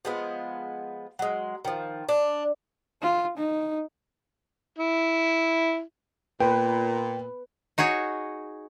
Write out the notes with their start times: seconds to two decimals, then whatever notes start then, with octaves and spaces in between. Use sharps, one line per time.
0.05 F3 G#3 B3
1.19 F#3 G#3
1.65 D#3 F3
2.09 D4
3.02 F4
3.37 D#4
4.78 E4
6.41 A#2 B4 G5
7.78 D#4 F#4 G#4 C#5